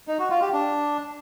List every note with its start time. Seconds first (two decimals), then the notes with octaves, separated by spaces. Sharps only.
0.08 D#4
0.19 F#4
0.30 F4
0.42 G4
0.53 D4